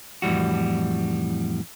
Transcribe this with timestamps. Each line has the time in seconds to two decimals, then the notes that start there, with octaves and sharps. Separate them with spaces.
0.22 F2 A2 E3 G3 F#4